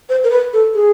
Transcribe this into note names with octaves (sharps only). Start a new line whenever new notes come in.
C5
A#4
B4
A4
G#4